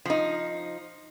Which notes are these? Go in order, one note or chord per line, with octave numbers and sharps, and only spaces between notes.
F3 D#4